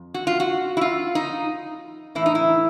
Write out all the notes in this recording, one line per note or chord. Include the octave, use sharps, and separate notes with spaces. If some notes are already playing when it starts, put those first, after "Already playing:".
Already playing: F2
F#4
F4
F#4
E4
F4
D#4
A2 E3 E4
D#4
E4